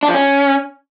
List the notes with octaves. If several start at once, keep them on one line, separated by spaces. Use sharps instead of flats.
D4
F3
C#4